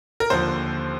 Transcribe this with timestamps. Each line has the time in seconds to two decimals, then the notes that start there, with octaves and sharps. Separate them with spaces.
0.20 A#4
0.30 D#2 D3 F3 C5